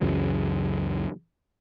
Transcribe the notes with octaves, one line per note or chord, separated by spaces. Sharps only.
C#2 F#2 C#3 E3